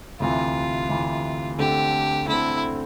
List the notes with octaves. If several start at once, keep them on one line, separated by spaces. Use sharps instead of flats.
D2 C3 E3 F4
D2 C3 E3
D3 A3 C4 G4
D3 A3 C4 E4